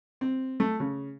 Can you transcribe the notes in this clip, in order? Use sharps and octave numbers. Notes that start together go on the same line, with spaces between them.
C4
A3
C#3